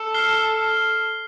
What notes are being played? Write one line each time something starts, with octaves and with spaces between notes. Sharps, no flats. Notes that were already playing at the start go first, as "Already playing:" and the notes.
Already playing: A4
F6 C7 G7